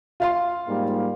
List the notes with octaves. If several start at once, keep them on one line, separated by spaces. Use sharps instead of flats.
F4 F5 C6
G#2 G3 A#3